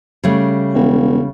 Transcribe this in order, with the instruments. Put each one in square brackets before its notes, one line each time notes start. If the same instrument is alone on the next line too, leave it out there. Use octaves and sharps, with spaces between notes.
[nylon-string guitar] C#3 G3 A3
[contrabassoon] E1